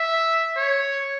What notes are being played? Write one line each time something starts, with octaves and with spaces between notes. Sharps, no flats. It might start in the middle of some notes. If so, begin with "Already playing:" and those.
Already playing: E5
C#5